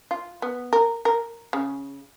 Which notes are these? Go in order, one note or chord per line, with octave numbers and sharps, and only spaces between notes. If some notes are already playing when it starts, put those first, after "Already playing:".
F4
B3
A#4
A#4
C#3